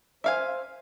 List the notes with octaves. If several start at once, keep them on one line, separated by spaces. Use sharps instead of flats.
C5 E5 F5 G#5